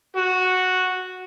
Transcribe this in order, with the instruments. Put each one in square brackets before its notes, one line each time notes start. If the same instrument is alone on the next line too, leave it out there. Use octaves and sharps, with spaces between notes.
[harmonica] F#4